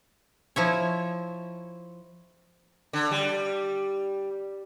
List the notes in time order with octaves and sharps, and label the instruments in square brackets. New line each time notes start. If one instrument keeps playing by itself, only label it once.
[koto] F3 E4 C#5
[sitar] D3
G3